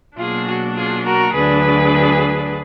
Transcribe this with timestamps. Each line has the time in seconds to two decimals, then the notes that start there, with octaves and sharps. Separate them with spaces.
0.17 B2 F#3 A#3 D4 F4 G#4
0.46 F#4
0.75 F4 G#4
1.04 F#4 A#4
1.33 D2 D3 F#3 D4 G#4 B4